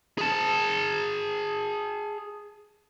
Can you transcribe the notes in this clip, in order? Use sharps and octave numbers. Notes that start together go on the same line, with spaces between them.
G#4 A5